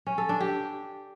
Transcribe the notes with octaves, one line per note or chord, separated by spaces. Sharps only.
C#4
A4
D4
G4